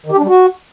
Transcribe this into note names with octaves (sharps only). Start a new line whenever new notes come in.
D#3
G4
D4
G3
F#4